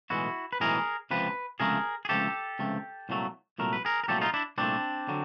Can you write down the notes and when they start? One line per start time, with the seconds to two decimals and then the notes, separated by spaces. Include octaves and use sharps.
0.10 B1 A2 E3 G#3 E4 F#4
0.53 B4
0.60 B1 A2 E3 G#3 G#4 A#4
1.10 C#2 C3 F3 B4
1.60 C#2 C3 F3 A3 G#4 A#4
2.05 G#4
2.09 C#2 C3 F3 A3 G4 A4
2.59 C#2 C3 F3 A3
3.09 C2 A#2 F#3 A3
3.58 C2 A#2 F#3 A3 A#4
3.73 B4
3.85 G#4 A#4
4.04 A#4
4.08 C2 A#2 F#3 A3 G4 A4
4.21 D#4 F4
4.34 D4 E4
4.58 C2 A#2 F#3 A3 C4 D4
5.08 D3 F#3